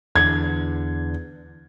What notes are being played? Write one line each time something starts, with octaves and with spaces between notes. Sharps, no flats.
E2 D3 G#6